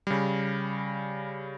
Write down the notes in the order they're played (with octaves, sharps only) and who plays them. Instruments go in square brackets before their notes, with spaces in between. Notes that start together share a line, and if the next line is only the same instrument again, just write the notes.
[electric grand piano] C#3 G3